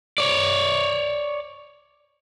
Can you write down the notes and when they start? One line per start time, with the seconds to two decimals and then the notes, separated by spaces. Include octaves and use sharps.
0.18 C#5 D5